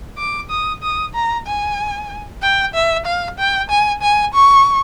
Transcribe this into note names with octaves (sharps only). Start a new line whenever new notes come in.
D6
D#6
D#6
A#5
G#5
G5
E5
F5
G5
G#5
G#5
C#6